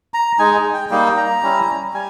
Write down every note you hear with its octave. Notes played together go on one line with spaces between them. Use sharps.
A#5
G#3 D#4 G#5
G5
G3 A#3 D#4 G5
A#5
G3 C#4 E4
G3 G#5